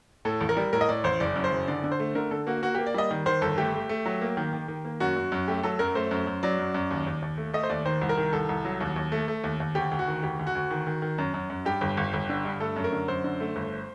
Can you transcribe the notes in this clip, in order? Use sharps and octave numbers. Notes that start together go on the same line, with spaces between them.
A2 A4
A1
A#4
G3
A2 A#4
D#5
A2 D5
A1 C5
F#1 D5
F#2
C5
F#1
D3 D5
D3
C5
A3
D3 A#4
D3 A4
A#3 F#4
A#3 F#4
A#3 G4
D5
G3 D#5
D#3
D#3 C5
G1 A4
A3 G4
A3
A3
F#3
A#3
D#3
D#3
D#3
A#3
F#2 F#4
F#2
F#2
A3 G4
F#3 A4
F#2 A#4
A3 C5
F#2
F#2
F#3 D5
F#2
F#2
D#2
D#2
D#2
A3
A3 D#5
C5
D#2 D5
D#3 C5
C2
A#4
D#3
C2 A4
C2
F#3
D#2
D#2
A3
A3
D#2
D#2
D2 G4
D2
F#4
D#3
D2 G4
D2
F#4
D2
D#3
D#3
D#3
F#2
F#2
F#2
G2 G4
G1
G1
G1
D3
G2
A3 A4
F#2
A#4
D3
F#2 C5
D3
A3
G1